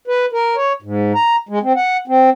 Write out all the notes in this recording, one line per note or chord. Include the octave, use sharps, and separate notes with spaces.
B4
A#4
C#5
G#2
A#5
G#3
C4
F#5
C4